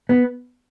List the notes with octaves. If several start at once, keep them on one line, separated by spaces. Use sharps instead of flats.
B3